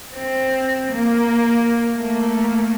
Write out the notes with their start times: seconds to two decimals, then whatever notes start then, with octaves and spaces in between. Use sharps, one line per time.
0.15 C4
0.93 A#3
1.97 A3 A#3